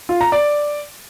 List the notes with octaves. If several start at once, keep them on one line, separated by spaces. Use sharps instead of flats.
F4
A#5
D5